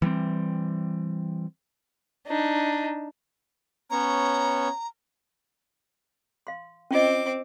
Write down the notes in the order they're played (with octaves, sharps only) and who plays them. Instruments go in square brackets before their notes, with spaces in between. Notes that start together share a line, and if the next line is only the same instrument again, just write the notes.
[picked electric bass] E3 G3 A3 C4
[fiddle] D4 D#4
[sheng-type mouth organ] B3 C#4 C#5 [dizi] A#5
[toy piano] F5 C6
[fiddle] C4 D6 [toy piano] C#4 F4 D#5